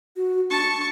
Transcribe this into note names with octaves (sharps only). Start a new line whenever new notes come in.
F#4
D4 A5 C#6